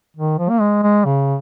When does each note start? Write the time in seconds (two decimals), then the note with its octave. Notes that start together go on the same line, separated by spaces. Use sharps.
0.17 D#3
0.39 F3
0.49 A#3
0.60 G#3
0.83 G#3
1.05 C#3